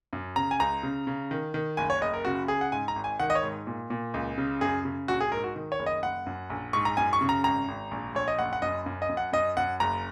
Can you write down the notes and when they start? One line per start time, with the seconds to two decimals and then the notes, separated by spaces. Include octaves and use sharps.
0.13 F#2
0.36 C#3 A#5
0.51 G#5
0.60 C#2 A#5
0.83 C#3
1.07 C#3
1.31 D#3
1.54 D#3
1.77 F#1 G#5
1.90 C#5
2.01 F#1 D#5
2.14 A#4
2.25 C#3 F#4
2.48 C#3 G#4
2.61 F#5
2.72 G#2 G#5
2.88 A#5
2.96 G#1
3.04 G#5
3.20 D#3 F#5
3.30 D#5
3.35 C#5
3.43 G#2
3.67 A#2
3.90 A#2
4.14 C#2
4.38 C#3
4.61 F#2 G#4
4.85 C#3
5.08 A#1 F#4
5.20 G#4
5.32 G#2 A#4
5.44 F#4
5.56 D#3
5.72 C#5
5.79 F#1
5.86 D#5
6.02 F#1 F#5
6.26 F#2
6.50 A#1
6.73 G#2 C#6
6.85 A#5
6.97 F#2 G#5
7.13 C#6
7.21 C#3
7.29 A#5
7.44 G#1 A#5
7.68 G#1
7.91 A#1
8.15 A#1 C#5
8.28 D#5
8.39 F#1 F#5
8.53 F#5
8.62 F#2 D#5
8.86 F#2
9.02 D#5
9.09 F#2
9.17 F#5
9.33 F#2 D#5
9.57 F#2 F#5
9.80 F#1 A#5